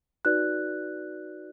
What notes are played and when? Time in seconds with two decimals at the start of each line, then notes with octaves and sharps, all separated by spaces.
0.25 D#4 F#4 B4 D5 F#6